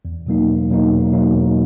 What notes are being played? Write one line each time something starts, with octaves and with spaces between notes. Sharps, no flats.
E2
B2 F#3 A#3 D#4
E2
B2 F#3 A#3 D#4
E2
B2 F#3 A#3 D#4
E2